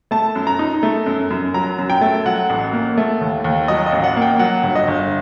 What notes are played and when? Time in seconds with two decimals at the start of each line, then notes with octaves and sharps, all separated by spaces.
0.11 A3 A5
0.36 F#2
0.47 A#5
0.59 D#4
0.83 A3
1.06 F#2
1.30 F#2
1.54 F#3 A#5
1.78 F#2
1.90 G5
2.01 A3
2.26 F#3 F#5
2.50 A1
2.73 A#3
2.97 A3
3.21 D#2
3.44 D#2
3.68 F#3 D#5
3.86 D#5
3.92 A1
4.04 F#5
4.16 A#3
4.22 G5
4.39 F#3 F#5
4.63 G1
4.75 D#5
4.88 G1